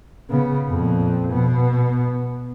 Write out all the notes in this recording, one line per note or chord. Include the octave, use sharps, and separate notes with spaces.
C#3 B3
F2 A#2
B2 B3